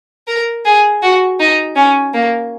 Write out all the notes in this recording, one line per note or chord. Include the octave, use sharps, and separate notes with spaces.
A#4
G#4
F#4
D#4
C#4
A#3